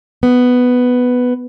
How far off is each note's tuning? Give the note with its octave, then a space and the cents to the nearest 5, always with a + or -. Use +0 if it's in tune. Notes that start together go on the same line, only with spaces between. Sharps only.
B3 +5